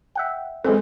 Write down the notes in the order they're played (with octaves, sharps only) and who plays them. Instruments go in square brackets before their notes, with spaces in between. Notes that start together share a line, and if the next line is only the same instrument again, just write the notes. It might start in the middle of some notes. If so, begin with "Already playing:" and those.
[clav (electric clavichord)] E5 F#5 G5
[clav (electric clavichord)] F#2 E3 [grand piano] G#3 C4 [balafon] A4